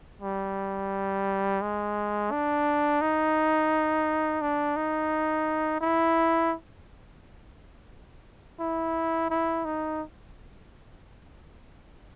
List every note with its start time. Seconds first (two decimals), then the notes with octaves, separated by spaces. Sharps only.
0.21 G3
1.62 G#3
2.32 D4
3.01 D#4
4.42 D4
4.77 D#4
5.81 E4
8.60 E4
9.30 E4
9.65 D#4